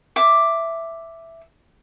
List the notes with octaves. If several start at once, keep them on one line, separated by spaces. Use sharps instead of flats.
E5 D6